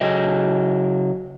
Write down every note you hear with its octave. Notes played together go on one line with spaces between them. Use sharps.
C#3 F#3 D#5